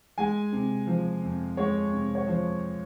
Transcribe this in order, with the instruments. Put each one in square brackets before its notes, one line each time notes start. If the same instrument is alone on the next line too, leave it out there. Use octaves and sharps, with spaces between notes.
[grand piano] G#3 G#5
C3
F3
F2
G#3 C#5
C3
C#5
F3 C5